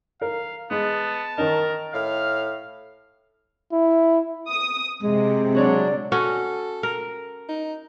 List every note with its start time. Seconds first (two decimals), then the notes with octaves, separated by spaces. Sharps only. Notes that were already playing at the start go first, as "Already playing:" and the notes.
0.21 A#4 F5
0.71 G#3 B3 A5
1.38 D#3 C#4 D#4 A#4
1.94 A2 F5 F6
3.72 E4
4.49 D#6
5.03 C3 G#3
5.55 F#3 D4 F#4 C#5 D5
6.12 C#4 F#4 A4
6.83 A#4
7.49 D#4